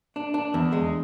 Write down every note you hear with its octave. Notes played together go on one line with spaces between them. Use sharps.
D4
D4
E2
G#3